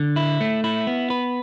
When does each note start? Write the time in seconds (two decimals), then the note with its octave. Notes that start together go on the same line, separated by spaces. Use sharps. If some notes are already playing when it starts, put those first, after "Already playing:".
Already playing: D3
0.16 E4
0.41 A3
0.64 E4
0.87 B3
1.10 B4